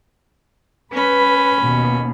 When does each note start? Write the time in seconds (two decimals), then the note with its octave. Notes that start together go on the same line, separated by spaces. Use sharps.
0.92 C#4 B4 B5
1.60 D#2 B2